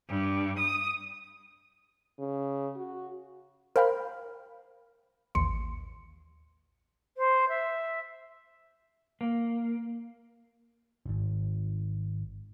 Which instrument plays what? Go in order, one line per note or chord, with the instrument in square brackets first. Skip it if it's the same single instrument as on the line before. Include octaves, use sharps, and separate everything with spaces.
[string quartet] G2
D#6
[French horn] C#3
F#4
[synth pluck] A#4 C5 F5 G5 B5 F6
A1 D#2 C6 C#7
[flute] C5
E5
[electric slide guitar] A#3
[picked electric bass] D#1 G#1